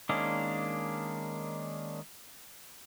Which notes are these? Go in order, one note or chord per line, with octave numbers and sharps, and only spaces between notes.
D#3 G#3 A#3 C#4 D4